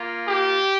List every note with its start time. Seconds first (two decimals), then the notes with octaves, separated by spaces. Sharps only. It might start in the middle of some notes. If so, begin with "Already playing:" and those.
Already playing: A#3 F4
0.27 G4